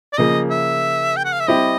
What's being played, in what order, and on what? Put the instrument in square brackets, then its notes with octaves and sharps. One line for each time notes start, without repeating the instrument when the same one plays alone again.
[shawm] D5
[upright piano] C#3 F3 A#3 [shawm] D#5
[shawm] E5
G5
F#5
F5
E5
[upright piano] G3 C4 E4 G4 [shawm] D#5